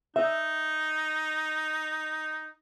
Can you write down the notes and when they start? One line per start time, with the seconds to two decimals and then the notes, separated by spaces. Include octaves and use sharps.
0.16 D#4 E5